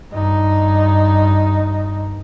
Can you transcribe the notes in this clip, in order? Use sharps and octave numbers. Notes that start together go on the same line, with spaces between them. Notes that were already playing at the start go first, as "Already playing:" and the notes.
G2 D#4